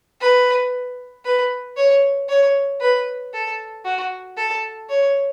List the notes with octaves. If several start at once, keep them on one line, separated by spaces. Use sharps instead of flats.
B4
B4
C#5
C#5
B4
A4
F#4
A4
C#5